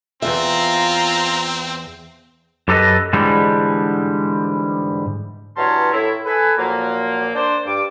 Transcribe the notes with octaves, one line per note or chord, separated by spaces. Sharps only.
E2 G2 C4 F4 E5 A#5
F#2 G4 A4 B4 D#5
G#2 D3 E3 G3 G#3
G2 E3 F#3 C#4 A5 C6
A2 E4
A4 B4 G#5
A#2 F3 F#3 A#3
D4 C5 D5
G2 D6